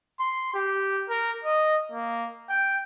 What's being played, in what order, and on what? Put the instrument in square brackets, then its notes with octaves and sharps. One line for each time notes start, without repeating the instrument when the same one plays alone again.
[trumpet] C6
G4
A#4
D#5
A#3
G5